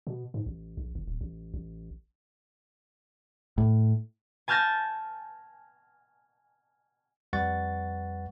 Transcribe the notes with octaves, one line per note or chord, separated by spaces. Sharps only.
B2
G#2
A1
A#1
G1
D1
A1
A1
A2
G#5 A5 F6 G6 A6 A#6
F2 G3 B4 F#5 C#6 A6